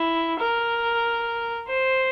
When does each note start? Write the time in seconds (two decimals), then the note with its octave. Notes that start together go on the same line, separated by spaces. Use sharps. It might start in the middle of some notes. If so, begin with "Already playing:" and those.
Already playing: E4
0.40 A#4
1.68 C5